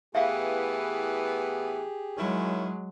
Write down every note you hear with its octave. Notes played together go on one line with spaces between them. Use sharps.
A2 E3 B3 G4 G#4 E5 F5
D#3 F#3 G#3 C#4 E4